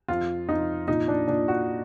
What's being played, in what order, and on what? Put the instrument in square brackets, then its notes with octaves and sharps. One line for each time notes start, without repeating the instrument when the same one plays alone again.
[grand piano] F2 F4
F2 D#4
A#2 D#4
D4
A#2 D4
F#4